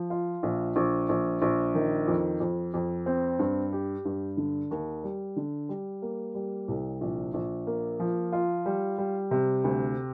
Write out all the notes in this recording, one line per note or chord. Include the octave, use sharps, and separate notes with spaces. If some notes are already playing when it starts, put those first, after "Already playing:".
Already playing: F3
F4
A#1
A#1
A#1
A#1
D#3
F2
F2
F2
C4
G2
G4
G2
D3
D#2
G3
D3
G3
A#3
G3
C2
A#1
A#1
A#3
F3
F4
G3
G3
C3
D2